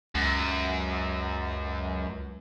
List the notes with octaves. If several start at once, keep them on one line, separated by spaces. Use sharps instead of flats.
C#2 F#2